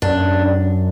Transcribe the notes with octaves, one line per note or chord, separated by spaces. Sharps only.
F#2 D4